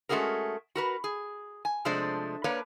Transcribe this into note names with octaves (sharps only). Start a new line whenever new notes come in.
G#3 A3 C#4 F#4 G#4 A#4
F#4 A#4 B4
G#4
G#5
C3 F3 G#3 A3 D4 C5
A#3 D4 A#4 B4 C#5